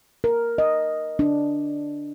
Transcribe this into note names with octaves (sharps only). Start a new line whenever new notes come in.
A#4
D#5
D4